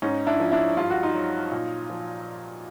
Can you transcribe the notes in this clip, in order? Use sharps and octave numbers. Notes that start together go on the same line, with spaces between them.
G#2 C#4 D#4
D4 E4
F3
D4 E4
G2 F4
F#4
D#4 F4
F#3
A#2
F3